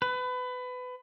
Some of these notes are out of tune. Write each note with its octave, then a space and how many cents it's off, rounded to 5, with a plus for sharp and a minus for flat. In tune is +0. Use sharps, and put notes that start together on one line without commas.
B4 +25